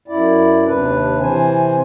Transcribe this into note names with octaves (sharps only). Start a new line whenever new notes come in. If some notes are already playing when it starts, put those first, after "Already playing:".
F#2 E4 D5
D#2 C3 D4 B4
C3 E3 C5 G#5